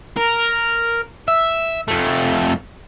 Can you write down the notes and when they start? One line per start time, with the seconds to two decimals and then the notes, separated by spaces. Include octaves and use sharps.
0.17 A#4
1.28 E5
1.88 F2 A3